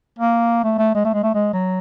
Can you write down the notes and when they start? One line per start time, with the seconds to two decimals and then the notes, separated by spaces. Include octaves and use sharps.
0.19 A#3
0.64 A3
0.78 A3
0.95 G#3
1.05 A3
1.13 G#3
1.24 A3
1.34 G#3
1.53 F#3